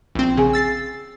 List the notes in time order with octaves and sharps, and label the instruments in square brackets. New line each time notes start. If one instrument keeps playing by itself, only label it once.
[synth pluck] A#1 C4
[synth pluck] C#3 [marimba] G#4 G#5
[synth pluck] E6 A6 C7